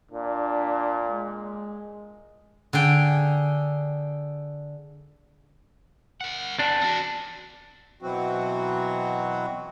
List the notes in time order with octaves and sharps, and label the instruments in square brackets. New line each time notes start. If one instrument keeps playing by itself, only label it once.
[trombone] A#2 [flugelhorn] D4
[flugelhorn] G#3
[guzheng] D3 G#4 G5
[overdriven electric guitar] A#4 F#5
[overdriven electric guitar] E2 [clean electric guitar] D4
[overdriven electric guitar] C4 F#4
[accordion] B2 E3 F#3 C4 F#4